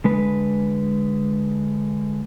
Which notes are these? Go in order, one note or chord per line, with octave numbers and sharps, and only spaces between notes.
D3 G#3 B4